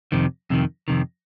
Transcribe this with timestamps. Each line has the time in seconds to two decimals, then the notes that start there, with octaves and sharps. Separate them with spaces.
0.12 F2 C3 D#3
0.50 F2 C3 D#3
0.88 F2 C3 D#3